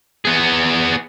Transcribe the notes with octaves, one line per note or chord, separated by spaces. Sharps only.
B3 G#4